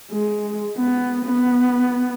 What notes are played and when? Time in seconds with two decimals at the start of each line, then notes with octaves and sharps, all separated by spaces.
0.11 G#3
0.77 B3
1.25 B3